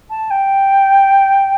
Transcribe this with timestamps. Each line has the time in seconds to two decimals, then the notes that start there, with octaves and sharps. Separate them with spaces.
0.10 A5
0.30 G5